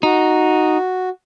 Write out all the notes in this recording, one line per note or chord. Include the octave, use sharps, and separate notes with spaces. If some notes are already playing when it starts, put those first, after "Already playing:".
D#4 F#4